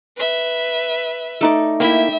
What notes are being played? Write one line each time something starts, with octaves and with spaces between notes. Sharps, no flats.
B4 E5
A3 D#4 D5
A#3 E4 E5 G5 B5